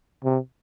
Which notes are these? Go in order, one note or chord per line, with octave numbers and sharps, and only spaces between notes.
C3